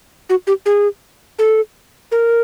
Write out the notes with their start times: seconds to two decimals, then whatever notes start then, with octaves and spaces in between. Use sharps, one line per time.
0.30 F#4
0.47 G4
0.66 G#4
1.39 A4
2.12 A#4